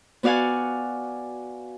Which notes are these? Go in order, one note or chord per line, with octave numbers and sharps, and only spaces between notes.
B3 F#4 D5 F5 F#5 G#5